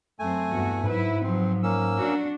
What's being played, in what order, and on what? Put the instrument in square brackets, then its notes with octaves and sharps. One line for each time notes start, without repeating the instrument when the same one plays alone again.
[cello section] F#2 C4 [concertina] A3 G#5
[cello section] E2 G2 F#4
[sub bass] G#2 [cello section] F#3 E4 B4
[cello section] F3 F#3 [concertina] C4
[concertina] A#3 C#4 E6
[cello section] D4 F#4